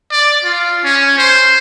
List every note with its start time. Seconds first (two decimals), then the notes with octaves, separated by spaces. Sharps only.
0.11 D5
0.44 F4
0.84 C#4
1.18 C5